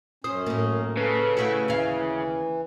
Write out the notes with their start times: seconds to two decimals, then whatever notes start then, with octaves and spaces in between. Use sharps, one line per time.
0.24 F#2 C#4 C5 D#6
0.46 A2 A#3
0.97 C#3 A4 B4
1.37 A3 E4 F#4
1.68 D#2 E3 C#4 F5